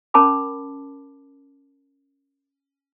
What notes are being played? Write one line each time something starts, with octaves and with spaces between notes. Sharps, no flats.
C#4 A#4 A5 B5 D6